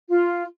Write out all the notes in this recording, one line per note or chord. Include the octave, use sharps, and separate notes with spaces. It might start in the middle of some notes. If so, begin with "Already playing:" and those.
F4